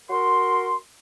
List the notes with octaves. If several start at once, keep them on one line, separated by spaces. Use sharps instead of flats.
F#4 A#4 C6